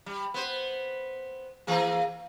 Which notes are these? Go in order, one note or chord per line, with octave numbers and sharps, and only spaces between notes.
G3
B3 C5
E3 A#3 G#4